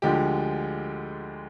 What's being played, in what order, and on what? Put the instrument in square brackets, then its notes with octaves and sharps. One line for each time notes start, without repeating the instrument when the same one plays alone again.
[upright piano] D2 D3 F3 G#3 G4